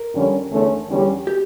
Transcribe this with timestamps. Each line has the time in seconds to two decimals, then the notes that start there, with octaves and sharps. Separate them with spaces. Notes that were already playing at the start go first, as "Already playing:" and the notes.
Already playing: A#4
0.14 F2 D3 G3 C#4
0.51 E2 D3 A3 C#4
0.89 E2 D3 G3 C#4 G4
1.27 G4